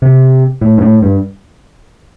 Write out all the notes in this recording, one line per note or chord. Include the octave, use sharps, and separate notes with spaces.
C3
A2
G2
A2
G2